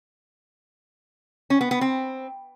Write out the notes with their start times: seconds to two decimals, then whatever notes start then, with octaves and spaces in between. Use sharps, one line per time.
1.50 C#4
1.61 B3
1.71 B3
1.81 C4